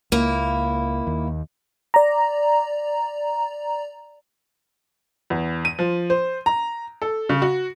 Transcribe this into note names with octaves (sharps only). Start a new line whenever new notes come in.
C#2 A#3 E4
D#2
D5 A#5
E2
D#7
F3
C5
A#5
A4
C#3
F#4